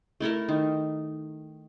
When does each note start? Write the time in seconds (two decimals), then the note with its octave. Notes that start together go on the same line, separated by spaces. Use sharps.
0.20 A3 E4 A4 A#4
0.49 D#3